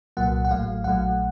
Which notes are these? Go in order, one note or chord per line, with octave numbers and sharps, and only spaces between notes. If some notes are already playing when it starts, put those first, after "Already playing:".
C2 A#2 F#3 A#3 F#5
F#5
A1 A2 F#3 A3 F5
A#1 A#2 F#3 A3 F#5